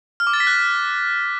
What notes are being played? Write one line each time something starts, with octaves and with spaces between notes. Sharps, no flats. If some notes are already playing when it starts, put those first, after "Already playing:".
F6
D6
A6
B6
F#6